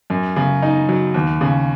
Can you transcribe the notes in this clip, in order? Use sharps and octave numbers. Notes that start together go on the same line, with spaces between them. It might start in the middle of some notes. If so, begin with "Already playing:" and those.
F#2
C#3
D#4
F#3
D#2
C#3